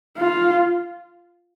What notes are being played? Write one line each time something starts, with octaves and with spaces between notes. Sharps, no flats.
F4